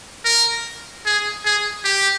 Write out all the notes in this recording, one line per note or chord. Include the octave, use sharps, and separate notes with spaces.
A#4
G#4
G#4
G4